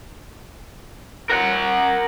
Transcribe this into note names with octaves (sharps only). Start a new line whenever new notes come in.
A#4 F#5